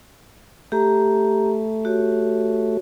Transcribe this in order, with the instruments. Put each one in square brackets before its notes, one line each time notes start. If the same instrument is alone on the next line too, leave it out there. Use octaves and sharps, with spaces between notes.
[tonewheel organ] A3 [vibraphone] G4 A#5
[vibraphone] F#4 G4 C#5